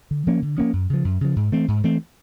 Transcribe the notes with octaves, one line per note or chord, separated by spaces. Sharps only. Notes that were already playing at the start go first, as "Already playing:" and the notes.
D3
F3 A#3 C#4
D3
F3 A#3 C#4
F#2
C#3 F3
F#2
C#3 F3
G#2
E3 A3 C4
G#2
E3 A3 C4